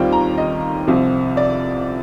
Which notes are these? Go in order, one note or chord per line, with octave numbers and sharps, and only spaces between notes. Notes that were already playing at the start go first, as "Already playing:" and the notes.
Already playing: D#2 D#3 G3 C4 F4 G5
A#5
D#5
C2 C3 F3 C4
D5